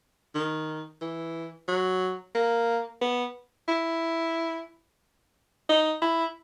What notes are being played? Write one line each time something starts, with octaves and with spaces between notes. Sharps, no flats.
D#3
E3
F#3
A#3
B3
E4
D#4
E4